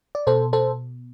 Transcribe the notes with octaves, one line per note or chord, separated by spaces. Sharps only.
D5
B2 A4 C5
A4 C5